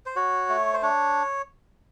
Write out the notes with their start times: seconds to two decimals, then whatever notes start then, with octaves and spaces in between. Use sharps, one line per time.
0.06 C5
0.16 F#4 C#5
0.49 A3
0.74 C5
0.82 D4 C#5